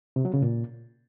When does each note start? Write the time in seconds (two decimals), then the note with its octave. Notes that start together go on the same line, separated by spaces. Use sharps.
0.16 C3
0.25 F#3
0.34 C#3
0.42 A#2